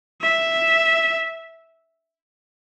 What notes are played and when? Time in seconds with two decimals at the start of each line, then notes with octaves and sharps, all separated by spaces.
0.22 E5